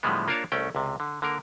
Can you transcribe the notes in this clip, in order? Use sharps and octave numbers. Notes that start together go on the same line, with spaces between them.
A2 D3 F3 G3 G#3 B3
A#3 D4 F4 A#4 C#5 A5
C2 A3 C#4 G5
C#2 C3
D3
D3 A#3 A#4